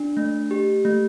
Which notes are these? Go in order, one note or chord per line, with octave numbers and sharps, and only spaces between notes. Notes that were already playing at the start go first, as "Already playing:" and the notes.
Already playing: D4
A3
G4
A3